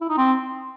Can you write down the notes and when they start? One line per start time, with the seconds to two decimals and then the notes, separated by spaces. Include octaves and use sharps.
0.01 E4
0.09 D#4
0.18 C4